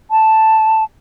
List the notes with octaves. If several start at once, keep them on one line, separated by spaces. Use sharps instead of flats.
A5